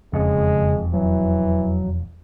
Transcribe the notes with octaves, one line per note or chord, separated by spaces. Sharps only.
E1 F2 C#3 G#3
E3 F#3